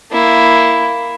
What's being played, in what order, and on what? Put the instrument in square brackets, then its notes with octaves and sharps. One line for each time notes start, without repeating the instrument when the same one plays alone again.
[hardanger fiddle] A#3 E4